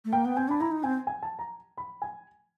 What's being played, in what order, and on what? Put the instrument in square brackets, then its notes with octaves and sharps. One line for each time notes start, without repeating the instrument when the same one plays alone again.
[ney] A3
[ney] A#3 [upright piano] G5
[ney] B3
[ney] C4 [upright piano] G#5
[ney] D4 [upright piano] B5
[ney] E4 [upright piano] A#5
[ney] D#4
[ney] C4 [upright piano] G#5
[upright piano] G#5
A5
A#5
B5
G#5